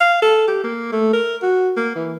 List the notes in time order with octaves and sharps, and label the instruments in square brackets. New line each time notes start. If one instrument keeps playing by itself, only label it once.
[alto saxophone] F5
A4
G4
A#3
A3
A#4
F#4
A#3
E3